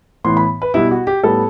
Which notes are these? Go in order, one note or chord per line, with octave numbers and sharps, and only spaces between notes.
A2 E3 B3 C6
B5
B4
B2 G3 B3 E4
F#4
G4
A2 G3 B3 A4